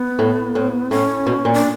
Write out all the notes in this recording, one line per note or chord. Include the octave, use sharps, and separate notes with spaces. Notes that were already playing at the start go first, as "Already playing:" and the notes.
Already playing: B3
A2
A2
A2 C#4
B2
A#2
D4